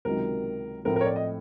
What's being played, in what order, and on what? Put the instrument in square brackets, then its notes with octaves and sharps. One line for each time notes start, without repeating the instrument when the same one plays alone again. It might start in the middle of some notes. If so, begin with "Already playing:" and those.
[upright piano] C#2 C3 D#3 F#3 [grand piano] A#4
[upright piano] A2 F3 A3 C4 [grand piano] A#4
[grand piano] A#4
C#5
D5
D#5